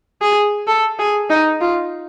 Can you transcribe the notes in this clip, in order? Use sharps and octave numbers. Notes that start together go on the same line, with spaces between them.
G#4
A4
G#4
D#4
F4